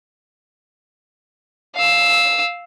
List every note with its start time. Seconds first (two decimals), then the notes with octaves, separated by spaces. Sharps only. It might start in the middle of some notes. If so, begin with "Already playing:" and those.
1.75 F5 E6